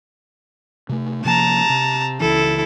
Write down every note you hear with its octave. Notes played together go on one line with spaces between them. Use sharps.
C3 A3
C3 F3 A#3 A5 A#5
C3
C#2 C#3 E3 E4 A4